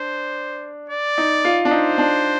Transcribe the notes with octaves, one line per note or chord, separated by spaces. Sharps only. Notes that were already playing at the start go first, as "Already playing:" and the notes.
Already playing: D4 C5
D5
D#4
F4
D4
D#4 C5
D4